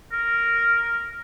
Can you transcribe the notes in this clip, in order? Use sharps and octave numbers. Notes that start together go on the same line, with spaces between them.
A#4